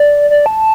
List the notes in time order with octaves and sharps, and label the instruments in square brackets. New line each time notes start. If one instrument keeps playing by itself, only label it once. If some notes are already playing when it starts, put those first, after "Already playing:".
Already playing: [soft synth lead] D5
D5
A5